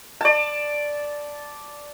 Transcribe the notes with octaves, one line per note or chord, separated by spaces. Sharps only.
D5 A5